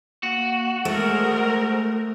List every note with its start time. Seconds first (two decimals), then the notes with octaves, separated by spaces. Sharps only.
0.23 A#3 F#4
0.85 G#3 A3 A#4 C5